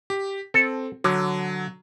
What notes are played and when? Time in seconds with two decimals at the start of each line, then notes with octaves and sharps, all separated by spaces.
0.10 G4
0.54 C4 A4
1.04 D3 F#3